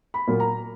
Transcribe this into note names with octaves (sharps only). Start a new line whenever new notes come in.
B5
A#2 F#3 A#3
A#5